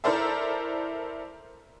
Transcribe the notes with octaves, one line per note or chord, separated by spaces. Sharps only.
E4 A4 A#4 C5 D5 E5